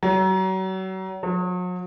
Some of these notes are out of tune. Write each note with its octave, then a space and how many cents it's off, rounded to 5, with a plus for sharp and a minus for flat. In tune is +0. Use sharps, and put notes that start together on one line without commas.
F#3 +35
F#3 -40